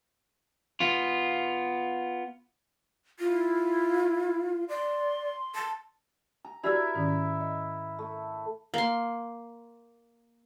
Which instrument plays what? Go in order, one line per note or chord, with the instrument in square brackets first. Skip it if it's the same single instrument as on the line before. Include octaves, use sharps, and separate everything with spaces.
[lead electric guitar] B3 F4
[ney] E4 [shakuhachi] F4
[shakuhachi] D5 [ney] C6
[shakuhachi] A5
[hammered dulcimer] A#5
[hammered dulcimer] E4 A#4 E5 [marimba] F#4 G4 D5
[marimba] G#2 D#3 C#4
D#5
[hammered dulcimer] A3
[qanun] A#3 C6